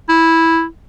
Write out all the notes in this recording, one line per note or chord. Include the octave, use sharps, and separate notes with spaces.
E4